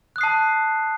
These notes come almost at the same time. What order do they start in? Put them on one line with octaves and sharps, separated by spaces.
F#6 D#6 C7 A5